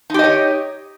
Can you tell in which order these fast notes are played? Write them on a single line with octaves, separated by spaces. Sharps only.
D#4 G4 D#5 C#5